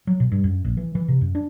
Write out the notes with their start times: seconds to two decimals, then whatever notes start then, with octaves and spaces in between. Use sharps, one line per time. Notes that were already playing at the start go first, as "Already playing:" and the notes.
0.07 F#3
0.20 B2
0.32 G2
0.44 F#2
0.64 A#1
0.77 E3
0.95 E3
1.08 C3
1.21 F#2
1.35 D4